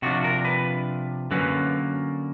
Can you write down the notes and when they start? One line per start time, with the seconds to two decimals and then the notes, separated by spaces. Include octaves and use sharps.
0.02 C3 F3 A3 D4 F4 F#4
0.24 A#4
0.45 B4
1.31 D3 F#3 A#3 C#4 B4